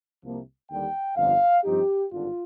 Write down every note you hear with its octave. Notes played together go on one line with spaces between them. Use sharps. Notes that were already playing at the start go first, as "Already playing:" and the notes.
C2 C3 F3 A#3
D#2 D3 G3 G5
G1 F2 D3 F5
G2 F3 C4 D#4 G4
G#1 G2 D3 F4